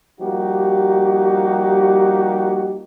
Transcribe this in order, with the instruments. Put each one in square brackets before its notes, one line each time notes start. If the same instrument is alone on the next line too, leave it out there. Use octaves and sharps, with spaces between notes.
[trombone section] F3 G3 A#3 D#4 F#4 G4